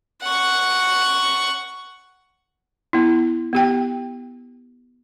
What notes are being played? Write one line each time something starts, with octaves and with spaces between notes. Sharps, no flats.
F#5 C#6
B3 E4
B3 G4 G5